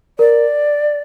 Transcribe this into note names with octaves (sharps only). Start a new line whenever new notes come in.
A#4 D5